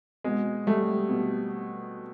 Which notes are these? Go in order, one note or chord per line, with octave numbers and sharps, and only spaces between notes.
B2 G#3
G3 A3
B2